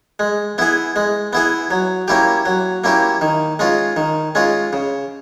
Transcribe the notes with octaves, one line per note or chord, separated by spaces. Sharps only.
G#3
B3 E4 G#4
G#3
B3 E4 G#4
F#3
A#3 C#4 E4 G4
F#3
A#3 C#4 E4 G4
D#3
G#3 C#4 F4
D#3
G#3 C#4 F4
C#3